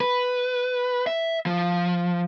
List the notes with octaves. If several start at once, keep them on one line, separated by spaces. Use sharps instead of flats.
B4
E5
F3